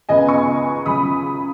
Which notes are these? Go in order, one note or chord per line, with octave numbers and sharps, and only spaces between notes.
C#2 C#3 G#3 B3 D#5 G#5
G#5 C#6
C#2 C#3 F#3 B5 D#6